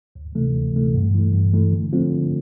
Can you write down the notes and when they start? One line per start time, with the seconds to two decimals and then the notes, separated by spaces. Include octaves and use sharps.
0.16 D2
0.35 C3 E3 A3
0.55 D2
0.74 C3 E3 A3
0.94 G2
1.14 E3 A3
1.33 G2
1.54 E3 A3
1.72 D3
1.93 F3 A3 C4 F4
2.13 D3